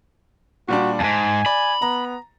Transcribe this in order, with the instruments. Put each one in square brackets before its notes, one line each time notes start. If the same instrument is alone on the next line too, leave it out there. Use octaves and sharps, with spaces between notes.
[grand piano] A#2 G3 D4 [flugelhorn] F#4
[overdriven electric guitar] F2 G#2 [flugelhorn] G#5 [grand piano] A5
[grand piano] D5 [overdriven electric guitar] B5
[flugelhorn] B3 [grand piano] A#5